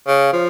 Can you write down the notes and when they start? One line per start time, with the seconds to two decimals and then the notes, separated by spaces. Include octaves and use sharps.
0.07 C#3
0.33 F3